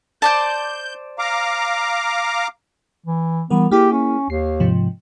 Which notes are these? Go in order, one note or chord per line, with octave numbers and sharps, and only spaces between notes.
C5 D5 A5 G6
F5 A#5 D6
E3
E3 G3 B3 A#4
A#3 E4 G4 G#4
C#4
D#2 C7
G#2 C3 F3